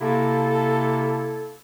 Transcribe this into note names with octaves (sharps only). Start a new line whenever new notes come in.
C3 A#3 E4 A4